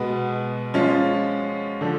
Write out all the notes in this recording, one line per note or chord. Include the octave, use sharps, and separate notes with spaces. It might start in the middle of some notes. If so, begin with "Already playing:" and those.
Already playing: B2 G#3 B3
F3 G#3 C#4 F4
D3 F3